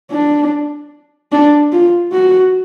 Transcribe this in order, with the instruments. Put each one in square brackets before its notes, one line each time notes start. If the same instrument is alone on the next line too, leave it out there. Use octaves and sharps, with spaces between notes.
[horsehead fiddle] D4
D4
F4
F#4